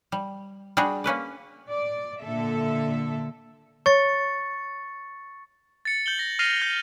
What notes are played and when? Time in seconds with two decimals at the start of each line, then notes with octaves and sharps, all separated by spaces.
0.12 G3
0.77 G3 D4 F#4 G#4
1.04 A#3 C#4 B4 D5
1.70 D5
2.22 A#2 D3 A4 E5
3.86 C#5 C#6 A6 C#7
5.85 A6 C#7
6.06 G6 F#7 G7
6.19 A#6
6.39 F6 A6 A#6 C7 D#7 F7
6.62 G6